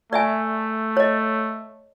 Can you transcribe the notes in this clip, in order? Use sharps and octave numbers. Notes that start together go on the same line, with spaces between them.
A3 D5 E5 G#5
C#5 D#5